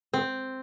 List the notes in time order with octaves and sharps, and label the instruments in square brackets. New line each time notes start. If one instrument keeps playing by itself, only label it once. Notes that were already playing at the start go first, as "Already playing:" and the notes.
[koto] C4